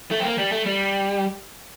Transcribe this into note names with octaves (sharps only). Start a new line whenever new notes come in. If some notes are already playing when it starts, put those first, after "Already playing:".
A3
C4
A#3
G3
A3
G3